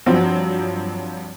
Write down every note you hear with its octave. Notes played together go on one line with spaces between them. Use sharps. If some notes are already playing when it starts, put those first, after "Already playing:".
G2 F3 F#3 C4 F#4